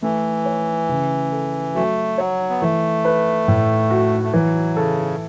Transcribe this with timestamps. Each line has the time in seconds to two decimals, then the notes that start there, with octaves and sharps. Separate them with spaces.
0.02 E3 A3
0.45 C#5
0.89 C#3
1.32 A4
1.75 F#3 A3
2.18 F#3 C#5
2.50 B3
2.61 E3 A3
3.05 B4
3.48 A2
3.91 F#4
4.24 A3
4.33 E3 F#3
4.77 C#3 A4